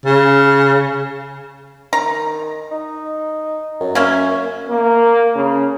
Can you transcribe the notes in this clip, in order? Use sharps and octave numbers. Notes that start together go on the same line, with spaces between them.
C#3
D#3 A#5
D#4
F#2
A#3 C#4 E5
A#3
C#3